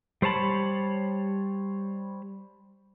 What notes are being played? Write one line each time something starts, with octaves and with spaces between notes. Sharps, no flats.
G3 C5 C#5 A5 B5